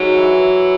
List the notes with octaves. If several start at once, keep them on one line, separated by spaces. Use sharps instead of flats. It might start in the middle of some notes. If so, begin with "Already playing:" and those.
Already playing: G#2 F#3
E3
E3